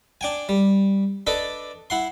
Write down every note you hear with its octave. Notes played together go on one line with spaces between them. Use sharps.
D4 G5 G#5
G3
D4 A4 B4 D5 D#5
E4 F#5 C6